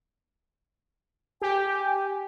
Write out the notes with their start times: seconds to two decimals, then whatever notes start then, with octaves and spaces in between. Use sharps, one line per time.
1.42 G4 G#5